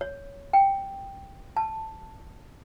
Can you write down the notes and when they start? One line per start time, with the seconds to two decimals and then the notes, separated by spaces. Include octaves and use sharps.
0.01 C#5
0.53 G5
1.57 A5